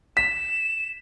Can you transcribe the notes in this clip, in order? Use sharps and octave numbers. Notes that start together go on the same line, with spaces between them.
B6 E7